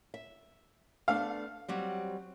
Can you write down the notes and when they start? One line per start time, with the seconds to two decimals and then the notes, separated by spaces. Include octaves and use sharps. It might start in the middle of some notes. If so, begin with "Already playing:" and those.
0.14 E5
1.08 A3 B3 D4 F5
1.68 F#3 G3 C4